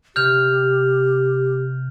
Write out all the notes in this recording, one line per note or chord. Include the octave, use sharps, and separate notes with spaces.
C3 G4 F6 G6 F7